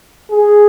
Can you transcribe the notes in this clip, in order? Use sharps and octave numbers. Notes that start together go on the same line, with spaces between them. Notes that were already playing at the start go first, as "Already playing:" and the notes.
G#4